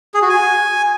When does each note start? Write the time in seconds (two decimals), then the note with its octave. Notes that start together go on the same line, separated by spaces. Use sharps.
0.14 G#4
0.22 F#4
0.29 G#5